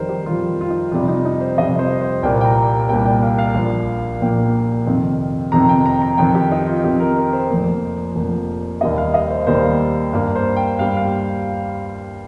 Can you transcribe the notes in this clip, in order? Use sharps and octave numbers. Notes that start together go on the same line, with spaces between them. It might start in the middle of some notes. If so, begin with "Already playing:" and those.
Already playing: F2 D#3 G3 A#4 C5
G4
F2 D#3 G3 F4
F4
D#4
F2 C3 G3 F4
D#4
D#4
C5
F2 C3 G3 D#5
C5
C5
C2 A#2 G3 A#3 G5
G5
A#5
C2 A#2 G3 A#3 G5
G5
F5
F5
A#1 A#2 F3 A#3
A#1 A#2 F3 A#3 G5
F2 C3 D#3 C4
F2 C3 D#3 C4 A#5
G5
A#5
A#5
F2 D#3 C4 G5
G4
D#4
F4
F2 D#3 C4 G4
A#4
A#4
C5
F1 F2 F3 A#3
F1 F2 F3 A#3
D#2 D#3 G3 A#3 D#5
F5
D#5
C5
D#2 D#3 G3 A#3 C5
G2 G3 A#3 F5
C5
G5
G2 G3 A#3 F5
F5
G5